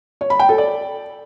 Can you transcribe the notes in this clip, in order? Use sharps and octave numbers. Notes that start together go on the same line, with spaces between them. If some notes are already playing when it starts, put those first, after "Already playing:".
C#5
B5
G5
A4
D5